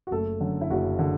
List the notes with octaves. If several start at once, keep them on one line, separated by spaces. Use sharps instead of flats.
F#4
F#1 A3 A4
F#2 D3
E4
F#1 F#4
D3